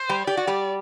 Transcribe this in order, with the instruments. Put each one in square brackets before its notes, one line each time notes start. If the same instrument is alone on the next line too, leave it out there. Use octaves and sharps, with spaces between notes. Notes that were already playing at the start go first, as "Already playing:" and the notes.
Already playing: [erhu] C5
[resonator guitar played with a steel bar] G3 G4
[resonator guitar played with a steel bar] G4 [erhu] D5
[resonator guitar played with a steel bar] F#4
G3 G4